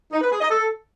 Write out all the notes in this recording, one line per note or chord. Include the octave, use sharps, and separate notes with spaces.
D#4
B4
G#4
D#5
A4